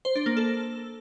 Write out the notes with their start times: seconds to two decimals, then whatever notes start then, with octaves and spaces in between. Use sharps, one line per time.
0.05 C5
0.16 D4
0.26 A#3
0.37 A4